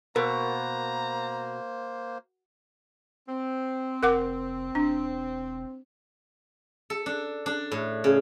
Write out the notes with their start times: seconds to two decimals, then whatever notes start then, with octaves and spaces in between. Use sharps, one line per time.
0.16 B2 A#3 A#4 C5 A#5
3.28 C4
4.03 F1 A#4 F#5 D6
4.75 E1 D4
6.90 A4
7.06 D4
7.46 D4
7.72 A2
8.04 C#3